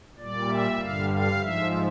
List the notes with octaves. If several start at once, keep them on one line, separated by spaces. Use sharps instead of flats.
A#2 G3 D5
E5
G2 D3 G3 F5
F5
G#2 F3 E5